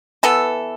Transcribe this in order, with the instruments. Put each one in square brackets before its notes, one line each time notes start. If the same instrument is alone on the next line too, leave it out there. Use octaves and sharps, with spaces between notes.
[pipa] E3 B3 A4